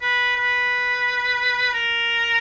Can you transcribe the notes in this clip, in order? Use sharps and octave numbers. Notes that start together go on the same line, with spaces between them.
B4
B4
A#4